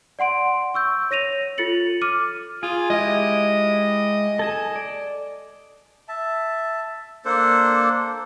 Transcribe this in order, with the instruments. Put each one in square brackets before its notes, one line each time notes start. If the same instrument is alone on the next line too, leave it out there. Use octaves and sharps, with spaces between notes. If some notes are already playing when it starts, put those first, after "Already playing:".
[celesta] D5 F#5 C6 D7
C#6 E6 G6
C#5 A#6 D#7 F7
F4 A4 A6 C#7 F#7
D6 F6 D#7
[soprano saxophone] F4 [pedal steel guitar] G#4
[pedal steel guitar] G#3 E4 G4 [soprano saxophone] D#5
[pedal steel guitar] A4 G#5 A5
D5
[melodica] E5 A5
A#3 D4 A4 C5